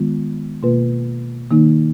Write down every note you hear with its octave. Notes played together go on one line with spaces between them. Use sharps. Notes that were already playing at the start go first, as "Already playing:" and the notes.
Already playing: D#3 G#3 B3 F4
B2 A#3 F4 B4
D#3 A#3 D#4